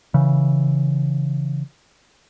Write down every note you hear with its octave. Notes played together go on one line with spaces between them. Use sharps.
C#3 E3